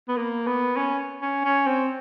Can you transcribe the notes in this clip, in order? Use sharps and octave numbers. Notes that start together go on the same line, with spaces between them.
B3
A#3
B3
C#4
C#4
C#4
C4